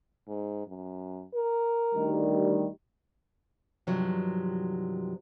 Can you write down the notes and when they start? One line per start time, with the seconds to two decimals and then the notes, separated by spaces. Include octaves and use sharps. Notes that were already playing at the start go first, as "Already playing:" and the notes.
0.28 G#2
0.67 F#2
1.35 A#4
1.94 D2 D#3 G3
3.87 G2 C3 D#3 F3 F#3